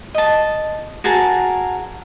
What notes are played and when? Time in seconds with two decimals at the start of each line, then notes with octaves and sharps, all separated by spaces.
0.14 D#5 A5
1.04 F#4 G#4 A#4 A5